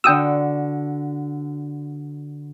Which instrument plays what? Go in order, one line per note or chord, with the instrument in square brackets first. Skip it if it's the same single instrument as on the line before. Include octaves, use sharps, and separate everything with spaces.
[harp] D3 F#4 [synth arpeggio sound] G5 D#6 E6